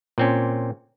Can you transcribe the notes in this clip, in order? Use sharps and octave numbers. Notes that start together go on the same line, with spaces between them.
A#2 C4 C#4